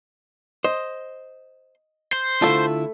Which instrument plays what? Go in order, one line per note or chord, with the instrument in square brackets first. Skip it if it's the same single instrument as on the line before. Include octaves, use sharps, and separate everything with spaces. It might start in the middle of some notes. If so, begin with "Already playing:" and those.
[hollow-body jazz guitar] C5 [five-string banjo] D#5
[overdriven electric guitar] C5
[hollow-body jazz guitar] D3 E4 F4 [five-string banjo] A3 A4